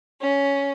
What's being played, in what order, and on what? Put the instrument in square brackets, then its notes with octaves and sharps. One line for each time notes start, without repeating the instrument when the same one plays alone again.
[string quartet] C#4